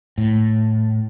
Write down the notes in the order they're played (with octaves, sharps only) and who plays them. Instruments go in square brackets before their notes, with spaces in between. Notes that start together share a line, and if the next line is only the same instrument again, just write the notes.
[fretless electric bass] A2